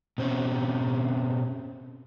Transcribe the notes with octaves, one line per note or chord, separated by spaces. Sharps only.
B2 C4 C#4